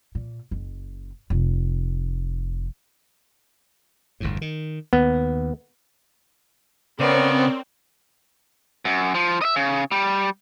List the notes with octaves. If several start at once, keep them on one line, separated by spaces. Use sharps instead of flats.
A#2
F#1
F1
G1 E2 A2
D#3
D#2 B3
C#3 B3 C4 A#4 C#5 D5
F#2
F3
D#5 E5
C#3
G3